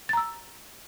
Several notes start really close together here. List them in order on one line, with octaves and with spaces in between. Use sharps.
A6 A#5 E6